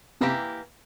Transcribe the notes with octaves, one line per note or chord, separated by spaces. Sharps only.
C3 E3 A#3 E4 G4